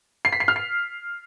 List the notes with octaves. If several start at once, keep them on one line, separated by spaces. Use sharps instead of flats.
C7
B6
C7
F6
C7